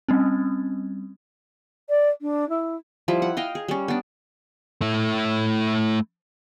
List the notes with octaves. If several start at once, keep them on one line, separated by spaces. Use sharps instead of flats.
G3 C4 C#4
D5
D4
E4
F3 G3 E4
F#5
D#5 F5 G5
G#4
G3 C#4
B3 D4
A3 E4